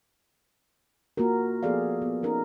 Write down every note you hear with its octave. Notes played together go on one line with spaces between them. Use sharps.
A#3 F4 F#4 A#4
F3 B3 G#4 A4 D5 F5
B3
C#4 D#4 A#4